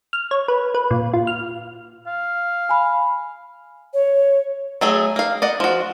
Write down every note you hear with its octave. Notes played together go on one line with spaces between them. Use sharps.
F6
C#5
B4
B4
A#2
F4
F6
F5
G#5 B5
C#5
F#3 A3 G#4
A#3 F5
D5 D#5 F#5
F3 F#4